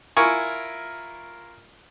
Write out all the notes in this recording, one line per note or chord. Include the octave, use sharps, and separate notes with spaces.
E4 F4 A#4 G#5 C#6